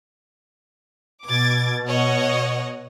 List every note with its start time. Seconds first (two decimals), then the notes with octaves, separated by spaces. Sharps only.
1.25 B2 D6 G#6 A6
1.86 C#5 D#5 F#5